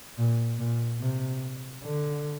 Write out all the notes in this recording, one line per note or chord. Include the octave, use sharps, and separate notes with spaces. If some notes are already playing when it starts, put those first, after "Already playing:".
A#2
A#2
C3
D3